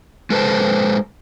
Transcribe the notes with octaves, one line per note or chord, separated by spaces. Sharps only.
G#3 A4 B4 C5 A5